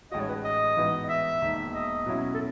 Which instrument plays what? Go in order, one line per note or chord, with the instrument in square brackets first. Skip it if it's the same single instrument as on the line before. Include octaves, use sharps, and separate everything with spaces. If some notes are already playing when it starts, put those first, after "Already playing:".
[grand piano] A1 A2 G#3 D#4 F#4 [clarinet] D#5
[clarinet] C#5
B4
D#5
[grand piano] G#2 E3 B3 F#4
[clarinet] D#5
E5
[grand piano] E1 D#2 D#3
[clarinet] D#5
[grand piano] B2 F#3 C#4 E4
[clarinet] A4